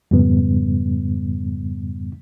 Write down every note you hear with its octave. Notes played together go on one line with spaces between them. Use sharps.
F2 G#2 C#3 G3 B3